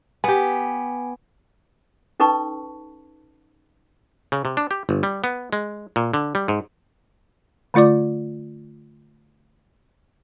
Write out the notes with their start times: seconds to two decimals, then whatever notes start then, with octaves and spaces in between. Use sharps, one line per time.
0.24 B3 G4 G#5
2.20 C#4 D#4 A4 B4 A5 C#6
4.32 C#3
4.45 C3
4.57 D4
4.71 G4
4.89 G1
5.03 G3
5.24 B3
5.53 G#3
5.96 A#2
6.14 D3
6.35 G3
6.48 G#2
7.74 D3 A3 F4 D5 D6